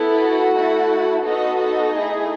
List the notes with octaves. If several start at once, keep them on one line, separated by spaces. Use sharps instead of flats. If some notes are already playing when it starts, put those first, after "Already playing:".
Already playing: B3 E4 A4
F#4 F#5
A3 E4 A4
B3 D#4 F#4 A4 D#5
D#4 D#5
A3 E4 G#4